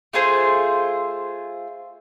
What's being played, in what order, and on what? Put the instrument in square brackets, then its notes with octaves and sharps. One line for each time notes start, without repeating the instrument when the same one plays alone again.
[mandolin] A3 F4 G#4 C5